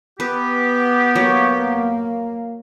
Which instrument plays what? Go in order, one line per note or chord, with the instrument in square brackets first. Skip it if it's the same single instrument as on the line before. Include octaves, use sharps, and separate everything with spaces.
[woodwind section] B3 G4 [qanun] B4
[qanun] F#3 C#5 [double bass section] A#3